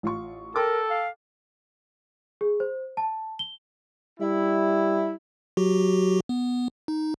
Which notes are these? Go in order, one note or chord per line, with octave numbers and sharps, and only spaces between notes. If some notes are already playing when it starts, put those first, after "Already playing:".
A1 F4 C#6
A4 A#4 G5 D6
F5
G#4
C5
A5
G7
G3 E4
F#3 F#4 G4
B3
D#4